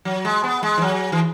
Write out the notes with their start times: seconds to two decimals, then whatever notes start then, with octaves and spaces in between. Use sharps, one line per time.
0.05 F#3
0.25 G#3
0.44 B3
0.63 G#3
0.77 E3
0.82 F#3
1.12 E3